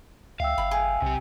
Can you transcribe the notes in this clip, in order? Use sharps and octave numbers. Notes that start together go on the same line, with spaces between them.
C#2 E5 F5 G5 E6
G1 B5
G#4
B1 C3 G4